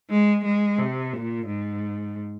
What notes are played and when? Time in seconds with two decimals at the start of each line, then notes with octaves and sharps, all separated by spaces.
0.10 G#3
0.45 G#3
0.79 C3
1.13 A#2
1.47 G#2